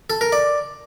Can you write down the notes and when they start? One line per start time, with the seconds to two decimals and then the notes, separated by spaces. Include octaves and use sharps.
0.10 A4
0.21 A#4
0.32 D5